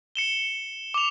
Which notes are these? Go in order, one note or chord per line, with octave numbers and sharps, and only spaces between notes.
C#7 E7 G7
D6 F7